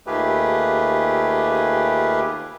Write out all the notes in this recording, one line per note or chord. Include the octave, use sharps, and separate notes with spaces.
D#2 A3 F4 G4 G#4 B4